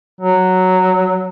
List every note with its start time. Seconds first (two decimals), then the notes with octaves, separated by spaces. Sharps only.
0.20 F#3